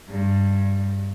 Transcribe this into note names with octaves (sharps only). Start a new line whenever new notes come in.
G2